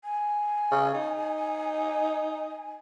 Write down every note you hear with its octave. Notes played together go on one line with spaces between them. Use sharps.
G#5
C#3
D#4